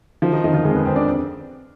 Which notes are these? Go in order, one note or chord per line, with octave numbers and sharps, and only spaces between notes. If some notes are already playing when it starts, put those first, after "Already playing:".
D#3 F3 F4
D#3 D#4
F2 D#3 D#4
F3 F4
F2 G#3 G#4
B3 B4
F2 C4 C5
D4 D5